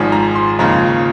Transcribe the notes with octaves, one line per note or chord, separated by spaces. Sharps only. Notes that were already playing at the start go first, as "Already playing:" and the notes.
Already playing: G#1 G#2 F3 G#5
A#5
C6
D#2 C#3 F3 G#3 A#5